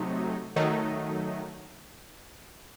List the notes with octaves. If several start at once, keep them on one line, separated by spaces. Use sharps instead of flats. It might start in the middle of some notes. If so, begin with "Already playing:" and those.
Already playing: C3 F#3 A3 D#4
D#3 F#3 A3 D#4